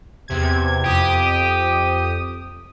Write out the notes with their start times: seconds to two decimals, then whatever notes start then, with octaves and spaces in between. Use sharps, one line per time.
0.28 E2 C3 G#6
0.84 F2 G4 D#6